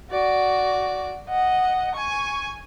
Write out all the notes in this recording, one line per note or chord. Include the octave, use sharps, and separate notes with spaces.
F#4 D5
D#5 F#5
G#5 C#6